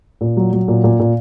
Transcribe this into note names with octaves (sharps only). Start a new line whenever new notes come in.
A#2
F#3
F#3
A#2
A#2
A#2